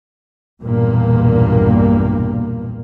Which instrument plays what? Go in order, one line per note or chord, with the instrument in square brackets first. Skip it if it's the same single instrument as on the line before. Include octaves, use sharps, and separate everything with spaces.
[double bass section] B1 E2 G2 A#2 A#3